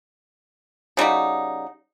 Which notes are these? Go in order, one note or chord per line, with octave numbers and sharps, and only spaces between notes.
C#3 G3 D#4 F#4